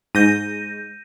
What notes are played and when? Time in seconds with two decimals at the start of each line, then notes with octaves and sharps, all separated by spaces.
0.15 G#2 G6 A#6 D#7